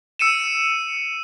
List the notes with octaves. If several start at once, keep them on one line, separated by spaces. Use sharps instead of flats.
E6 C#7 D#7 E7